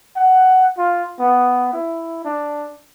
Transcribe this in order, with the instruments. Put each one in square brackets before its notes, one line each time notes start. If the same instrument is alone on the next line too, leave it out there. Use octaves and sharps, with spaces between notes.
[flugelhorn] F#5
F4
B3
E4
D4